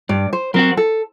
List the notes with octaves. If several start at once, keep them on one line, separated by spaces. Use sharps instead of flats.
G2 D5
C5
F#3 C4 F#4 A#4
A4